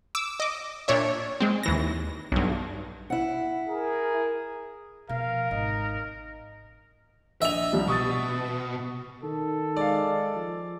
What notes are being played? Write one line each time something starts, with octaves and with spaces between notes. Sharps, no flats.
D6 E6
D#5 D6
A#2 D4 C#5 E5
G#3 C4
D#2 E3 A#6
B1 G2
E4 F#5
G#4 A#4
B2 F3 A#4 F5
G#1 D#4
A#1 D#5 E5 F7
C2 F3 G3
B2 C#6 D#6 A6
D#3 A4
G#3 D5 F5
F3